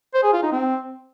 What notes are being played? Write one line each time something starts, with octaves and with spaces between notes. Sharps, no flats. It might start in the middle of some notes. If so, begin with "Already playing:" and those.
C5
G#4
F4
D#4
C4